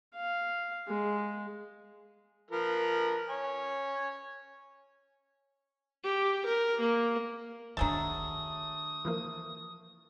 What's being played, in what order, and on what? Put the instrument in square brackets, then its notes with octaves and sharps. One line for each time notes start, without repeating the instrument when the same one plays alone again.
[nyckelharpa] F5
G#3
[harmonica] F3 A#4 B4
C#5 G#5
[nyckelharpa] G4
A#4
A#3
[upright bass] D#3 D4 [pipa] F#3 G#3 A3 [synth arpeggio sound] A5 [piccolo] D#6
[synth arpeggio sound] E3 F3 A#3